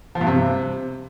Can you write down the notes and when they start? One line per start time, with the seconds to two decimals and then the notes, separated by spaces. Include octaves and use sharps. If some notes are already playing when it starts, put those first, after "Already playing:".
0.15 F3
0.21 G2
0.27 C3